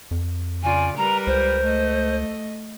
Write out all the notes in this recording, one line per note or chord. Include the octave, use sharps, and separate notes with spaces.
F2
C#3 F4 D5 G#5
G3 A#4 B4 A#5
C#2 C5
A3 D#5